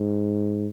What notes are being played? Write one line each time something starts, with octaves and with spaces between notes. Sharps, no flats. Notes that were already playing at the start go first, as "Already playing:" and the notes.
Already playing: G#2